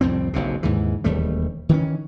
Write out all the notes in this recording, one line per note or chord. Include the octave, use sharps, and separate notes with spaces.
C2 F2 A2 C4
F#1 B1 F#2 C3
D#2 G#2 C#3 E3
E1 D#2 G3 A3
D#3 E3 G#3 C#4